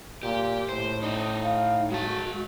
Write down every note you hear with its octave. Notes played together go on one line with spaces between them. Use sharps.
A#2 G4
A2 C5
D#4 D5
F5
G#3 F#4 A5